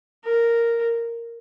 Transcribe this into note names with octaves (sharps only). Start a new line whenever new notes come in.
A#4